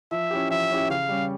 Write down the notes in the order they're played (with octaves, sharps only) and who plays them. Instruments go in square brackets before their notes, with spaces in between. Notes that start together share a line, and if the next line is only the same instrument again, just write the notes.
[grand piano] F3 [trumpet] E5
[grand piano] C#4 E4 G4
[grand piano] F3 [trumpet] E5
[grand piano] C#4 E4 G4
[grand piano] C#3 [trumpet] F5
[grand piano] G3 C#4